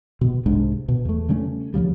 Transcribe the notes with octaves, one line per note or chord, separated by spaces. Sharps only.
B2
C2 G#2 G#3 D4
B2
E2 A3
C#3 G3 A3 C#4
D#2 C#3 F3 G3